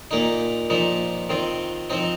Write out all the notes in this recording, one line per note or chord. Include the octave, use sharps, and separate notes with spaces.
A#2 A#3 D#4
A#2 F3 D#4
D#3 C4 F4
F3 C4 D#4